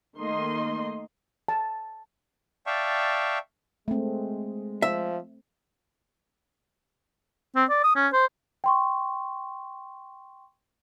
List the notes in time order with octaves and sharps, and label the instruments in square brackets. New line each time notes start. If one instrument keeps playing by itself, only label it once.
[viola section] D#3 A3 A#3 D#5 C6
[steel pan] A5
[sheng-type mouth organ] D5 E5 F5 G5 A5 C#6
[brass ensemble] G#3 [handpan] A3 C4
[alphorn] F3 [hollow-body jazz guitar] E5
[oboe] C4
D5
D#6
C#4
C5
[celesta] G5 C6 C#6